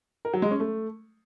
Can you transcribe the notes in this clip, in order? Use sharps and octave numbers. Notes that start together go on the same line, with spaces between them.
A#4
F#3
G#3
C#4
A3